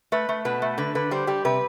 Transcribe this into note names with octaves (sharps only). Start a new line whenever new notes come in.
A3 B4
A3
B2 B4
A3
D3 B4
D3 B4
G3 C5
G3 G4
C3 B4